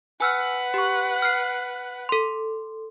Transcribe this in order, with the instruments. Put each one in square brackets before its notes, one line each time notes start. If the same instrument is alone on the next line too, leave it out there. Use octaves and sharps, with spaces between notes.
[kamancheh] B4 F#5 [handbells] G#5 E6 F6
[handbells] G4 C#6
F6 C7
A4 C6